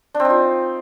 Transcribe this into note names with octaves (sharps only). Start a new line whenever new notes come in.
D4
C4
D#4
F4